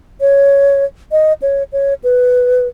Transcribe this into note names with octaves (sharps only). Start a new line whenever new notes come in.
C#5
D#5
C#5
C#5
B4